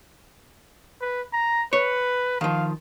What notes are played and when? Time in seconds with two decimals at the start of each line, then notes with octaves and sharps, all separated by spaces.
1.01 B4
1.33 A#5
1.73 B4 C#5
2.41 D#3 F3 F5